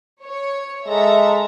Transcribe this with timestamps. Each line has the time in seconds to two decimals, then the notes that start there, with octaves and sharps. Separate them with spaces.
0.24 C#5
0.87 G#3 A4 E5 A#5